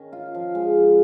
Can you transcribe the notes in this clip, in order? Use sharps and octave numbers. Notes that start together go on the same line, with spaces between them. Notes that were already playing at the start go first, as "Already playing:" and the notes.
Already playing: D#3 C#4
F4
F3
G#3
F3